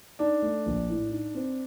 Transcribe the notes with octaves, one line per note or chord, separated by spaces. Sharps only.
D4 D#4
A3
A#1
A2
D#4
C4